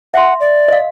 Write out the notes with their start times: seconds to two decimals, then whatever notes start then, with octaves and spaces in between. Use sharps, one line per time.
0.14 E5 F#5 C6
0.40 D5
0.68 D#5 F5